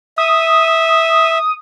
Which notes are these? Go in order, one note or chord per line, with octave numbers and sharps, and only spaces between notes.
E5 D#6